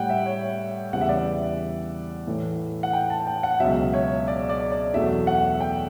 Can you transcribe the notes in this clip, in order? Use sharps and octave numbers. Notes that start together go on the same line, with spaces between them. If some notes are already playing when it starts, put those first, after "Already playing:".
Already playing: A2 G3 F#5 G5
E5
C#5
E2 C#3 E3 G3 F#5
E5
D5
E5
A2 E3 A3
F#5
G5
A5
G5
F#5
C#2 B2 F#3 E5
C#5
D5
D5
D5
E2 B2 F#3 A3 E5
F#5
G5